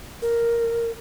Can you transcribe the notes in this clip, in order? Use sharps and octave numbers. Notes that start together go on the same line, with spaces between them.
A#4